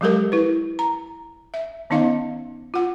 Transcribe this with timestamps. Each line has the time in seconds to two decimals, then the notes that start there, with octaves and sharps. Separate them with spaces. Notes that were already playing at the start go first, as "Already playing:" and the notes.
0.01 F3 F#3 G#3 G4 A4 A#4
0.32 E4 B4
0.79 A#5
1.54 E5
1.90 D#3 B3 C#4 D#4 D#5 F5
2.74 F4 F#5